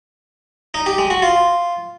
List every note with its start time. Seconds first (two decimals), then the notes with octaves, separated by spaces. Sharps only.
0.74 D#4
0.86 G4
0.98 G#3
1.10 F#4
1.22 F4